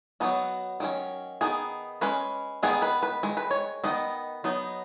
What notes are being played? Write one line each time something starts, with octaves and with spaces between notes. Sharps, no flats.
F#3 B3 D#4 F#4
D#3 F#3 C#4
D#3 B3 D#4 G#4
G#3 C#4 B4
D#3 G#3 B3 D#4 G#4
B4
B4
D#3 G#3
B4
C#5
D#3 B3 D#4 D#5
F#3 B3 D#4